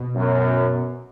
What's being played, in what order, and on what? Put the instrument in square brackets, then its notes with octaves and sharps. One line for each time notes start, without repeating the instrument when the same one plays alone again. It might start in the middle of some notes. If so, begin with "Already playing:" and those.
Already playing: [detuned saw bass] B2
[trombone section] F#2